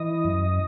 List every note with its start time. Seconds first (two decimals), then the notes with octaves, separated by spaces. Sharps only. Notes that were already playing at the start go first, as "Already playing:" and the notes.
Already playing: E3 D#5
0.24 F#2